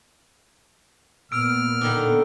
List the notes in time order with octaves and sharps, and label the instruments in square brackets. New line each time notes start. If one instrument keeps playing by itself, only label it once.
[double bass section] A#2 B3 [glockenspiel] E6 D7 [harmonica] F6
[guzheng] D3 D#3 D4